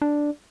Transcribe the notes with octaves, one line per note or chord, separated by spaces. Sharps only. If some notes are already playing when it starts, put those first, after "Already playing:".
D4